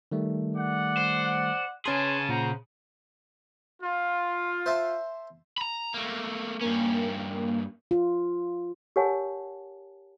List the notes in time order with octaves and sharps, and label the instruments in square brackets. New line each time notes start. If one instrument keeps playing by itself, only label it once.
[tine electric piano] D#3 G3 A3
[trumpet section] D5 F#5
[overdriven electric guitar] C5
[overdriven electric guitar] C#3 G#4 [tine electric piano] C#4 C6 [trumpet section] B4 G#5 A5
[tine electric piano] A#2 [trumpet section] C5 F#5 A#5
[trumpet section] F4
[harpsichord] C5 E5 A5
[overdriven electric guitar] A#5 B5
A3 A#3
[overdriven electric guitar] G2 C#4 [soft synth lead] A#3
[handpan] F4
[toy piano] G4 A#4 C#5 F#5 G#5 A5